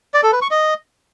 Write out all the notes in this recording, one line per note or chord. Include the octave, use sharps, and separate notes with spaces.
D5
A4
B4
C#6
D#5